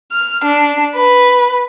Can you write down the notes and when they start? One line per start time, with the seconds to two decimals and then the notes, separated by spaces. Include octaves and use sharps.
0.12 F6
0.44 D4
0.95 B4